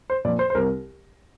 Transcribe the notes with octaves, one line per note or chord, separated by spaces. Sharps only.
C5
A#2 F3 D5
C5
C5
C2 A#4